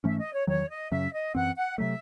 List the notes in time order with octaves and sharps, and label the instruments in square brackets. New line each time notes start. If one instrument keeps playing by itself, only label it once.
[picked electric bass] G#2 E3 A3 C#4 [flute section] E5
[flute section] D#5
C#5
[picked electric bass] E2 D#3 F#3 [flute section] C#5
[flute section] D#5
[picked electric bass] F#2 C#3 F#3 C#4 [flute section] E5
[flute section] D#5
[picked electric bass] F#2 E3 C4 [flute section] F#5
[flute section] F#5
[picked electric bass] C3 F#3 A3 [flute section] E5